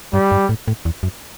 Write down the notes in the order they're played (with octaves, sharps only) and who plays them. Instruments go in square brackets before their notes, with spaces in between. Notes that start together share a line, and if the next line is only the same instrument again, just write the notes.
[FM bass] G2 [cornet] G3
[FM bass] G2
A2
A2
E2
F#2